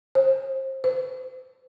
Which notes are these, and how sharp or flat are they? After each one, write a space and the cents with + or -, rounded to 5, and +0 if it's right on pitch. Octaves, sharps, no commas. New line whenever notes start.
C5 +30
C5 -40